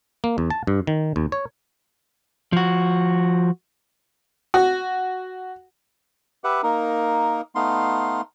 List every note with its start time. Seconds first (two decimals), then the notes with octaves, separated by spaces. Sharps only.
0.24 A#3
0.38 E2
0.50 A5
0.67 G2
0.87 D#3
1.16 D#2
1.32 C#5
2.53 F3 F#4
4.54 F#4
6.44 G4 B4 E5 F#5
6.63 A#3 D#4 A#4
7.55 A3 B3 D#4 F5 C6